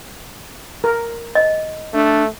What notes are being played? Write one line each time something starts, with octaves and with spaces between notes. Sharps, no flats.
A#4
D#5
A3 D4